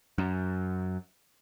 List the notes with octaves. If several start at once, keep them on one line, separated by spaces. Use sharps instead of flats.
F#2